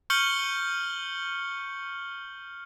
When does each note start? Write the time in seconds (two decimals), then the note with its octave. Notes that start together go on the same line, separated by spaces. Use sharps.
0.10 C#6 F6 G6 C#7 F#7 G7